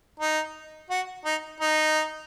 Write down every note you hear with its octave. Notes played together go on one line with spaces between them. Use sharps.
D#4
F#4
D#4
D#4